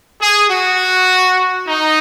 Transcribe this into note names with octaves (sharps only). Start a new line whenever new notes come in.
G#4
F#4
D#4